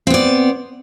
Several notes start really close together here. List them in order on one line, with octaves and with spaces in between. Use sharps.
C4 B3 D5